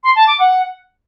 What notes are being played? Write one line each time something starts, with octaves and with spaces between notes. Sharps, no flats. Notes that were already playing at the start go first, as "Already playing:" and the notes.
C6
A5
D6
F#5